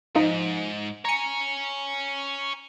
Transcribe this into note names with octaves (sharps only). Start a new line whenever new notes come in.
G#2 F3 D#4
C#5 G#5 A#5 C#7